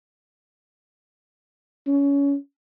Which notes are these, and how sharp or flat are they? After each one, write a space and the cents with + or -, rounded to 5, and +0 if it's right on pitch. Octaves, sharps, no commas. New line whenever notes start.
C#4 +25